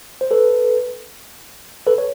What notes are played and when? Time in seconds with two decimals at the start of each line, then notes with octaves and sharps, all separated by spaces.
0.21 C5
0.31 A4 B4
1.87 A4 B4
1.98 C#5